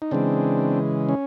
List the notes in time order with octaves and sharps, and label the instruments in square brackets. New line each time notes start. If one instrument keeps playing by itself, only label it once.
[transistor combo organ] D#4
C#3 E3 G#3 C4 D4
C#4